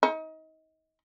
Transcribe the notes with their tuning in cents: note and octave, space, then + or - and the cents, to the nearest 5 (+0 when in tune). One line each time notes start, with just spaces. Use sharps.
D#4 +30